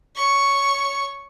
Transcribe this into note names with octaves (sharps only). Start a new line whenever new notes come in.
C#5 C#6